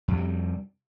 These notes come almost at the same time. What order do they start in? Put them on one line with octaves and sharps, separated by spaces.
F2 C3 G3